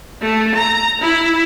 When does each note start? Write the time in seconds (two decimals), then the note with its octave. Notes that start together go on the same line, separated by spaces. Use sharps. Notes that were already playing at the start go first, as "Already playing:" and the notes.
0.22 A3
0.55 A#5
1.01 E4